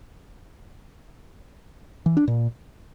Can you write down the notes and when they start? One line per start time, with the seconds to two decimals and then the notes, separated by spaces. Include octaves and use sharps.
2.06 E3
2.17 D4
2.28 A#2